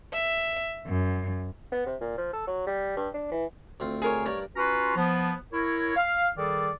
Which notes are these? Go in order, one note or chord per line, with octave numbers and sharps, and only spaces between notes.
E5
F#2
B3
C3
A#2
F3
A4
F#3
G3
G2
D4
E3
D2 C4 F4
G#4 A#4 C#5
G2 A#4 C#5 D5
C#4 F4 F#4 B4 A#5 C6
F3 B3
E4 A#4 C#5
F5
D#3 G3 G#4 A4 D5